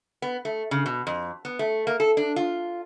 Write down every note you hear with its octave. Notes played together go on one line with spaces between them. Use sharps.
B3
A3
C#3
B2
F2
B3
A3
A#3
A4
D4
F4